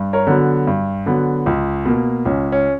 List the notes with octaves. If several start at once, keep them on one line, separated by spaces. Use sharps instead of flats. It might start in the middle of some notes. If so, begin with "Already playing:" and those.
Already playing: G2
A#4 C#5
D3 F#3 B3
G2
D3 F#3 B3
C#2
B2 A#3
C#2 C#4
C#4